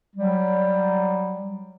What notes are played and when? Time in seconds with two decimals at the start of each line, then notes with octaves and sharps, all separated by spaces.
0.16 F#3 G3